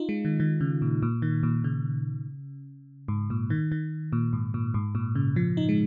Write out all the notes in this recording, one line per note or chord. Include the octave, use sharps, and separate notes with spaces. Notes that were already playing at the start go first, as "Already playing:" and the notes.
Already playing: D#4 F4
G#3
D#3
D#3
C#3
A#2
A#2
D#3
A#2
C#3
G#2
A#2
D#3
D#3
A#2
G#2
A#2
G#2
A#2
C#3
F3
D#4
G#3